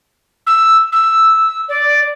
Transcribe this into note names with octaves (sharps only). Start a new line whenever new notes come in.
E6
E6
D5